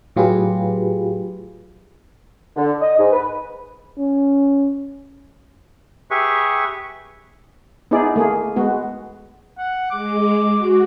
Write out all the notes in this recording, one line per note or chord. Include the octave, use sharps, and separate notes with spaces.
A2 F#3 F4 G4 G#4 B4
D3
D#5
G#2
B4
C#4
G4 G#4 B4 E5 C#6
B3 D#4 E4 G#4 D5
A3 A#3 G#4
G#3 B3 F#4
F#5
G#3 D6
F#4